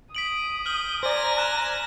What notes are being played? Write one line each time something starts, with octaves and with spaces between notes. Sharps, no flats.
D#6 B6 D7 F#7
F6 G6 F#7 G7
C5 D5 G#5 A#5 A#6
F6 F#6 E7